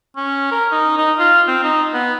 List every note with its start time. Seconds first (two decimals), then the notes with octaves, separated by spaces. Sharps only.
0.16 C#4
0.51 A#4
0.71 D#4
0.98 D#4
1.19 F4
1.47 C4
1.64 D#4
1.93 B3